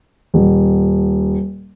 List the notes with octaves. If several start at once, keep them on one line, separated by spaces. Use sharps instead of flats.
D#1